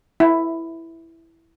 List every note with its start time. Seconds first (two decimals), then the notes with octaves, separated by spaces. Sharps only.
0.20 E4